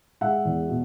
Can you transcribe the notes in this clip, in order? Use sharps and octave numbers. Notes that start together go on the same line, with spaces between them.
G#3 E5 F#5
E2
B2